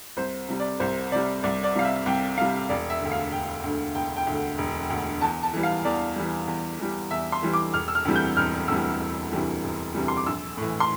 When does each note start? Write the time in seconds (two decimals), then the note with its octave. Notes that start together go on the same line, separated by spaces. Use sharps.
0.17 C2 C5
0.49 C3 G3
0.60 D5
0.80 C2 C5
1.11 C3 G3 D5
1.43 C2 D5
1.64 D5
1.75 C3 G3 F5
1.85 E5
2.06 C2 G5
2.38 C3 G3 F5
2.69 E1 D5
2.90 E5
3.01 D2 D3
3.12 F5
3.32 E1 G5
3.64 D2 D3
3.95 E1 G5
4.16 G5
4.27 D2
4.32 D3
4.58 E1
4.90 D2 D3
5.21 E2 A5
5.43 A5
5.53 E3 G3
5.63 F5
5.85 E2 D5
6.16 E3 G3
6.48 E2
6.79 E3 G3
7.11 E2 E5
7.32 C6
7.43 E3 G3
7.53 D6
7.74 E1 F6
7.88 E6
7.95 F6
8.05 D2 C3 E3 G3
8.16 G6
8.37 E1 F6
8.68 D2 C3 E3 G3 E6
9.01 E1
9.32 D2 C3 E3 G3
9.63 E1
9.95 D2 C3 E3 G3
10.08 C6
10.17 D6
10.26 A#1 E6
10.58 A2 E3
10.80 C6